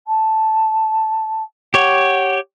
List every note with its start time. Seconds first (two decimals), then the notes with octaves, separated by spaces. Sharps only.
0.07 A5
1.74 G4 C#5 F#5